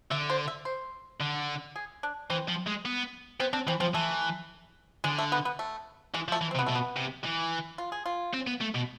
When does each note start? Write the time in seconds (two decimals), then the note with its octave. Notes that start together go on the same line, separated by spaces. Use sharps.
0.11 D3 E5
0.30 C5
0.48 E5
0.65 C5
1.21 D3
1.76 G#4
2.03 D4
2.30 E3 C4
2.48 F3
2.67 G#3
2.85 B3
3.40 B3 C4
3.53 C4 D4
3.67 E3 C4
3.80 F3 C4
3.94 E3 A3
5.04 D3 G#3
5.18 A3
5.32 B3
5.45 B3
5.59 A3
6.14 E3 G#3
6.28 F3
6.32 A3
6.41 E3
6.51 C4
6.55 C3
6.59 B3
6.66 B2 A3
6.75 B3
6.96 C3
7.24 E3
7.78 F4
7.92 G#4
8.06 F4
8.34 C4
8.47 B3
8.61 A3
8.75 B2